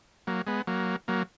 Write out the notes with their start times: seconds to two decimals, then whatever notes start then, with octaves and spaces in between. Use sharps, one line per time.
0.27 F#3 A#3
0.47 G#3 B3
0.67 F#3 A#3
1.08 F#3 A#3